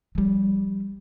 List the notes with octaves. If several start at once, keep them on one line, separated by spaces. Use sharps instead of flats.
F3 G3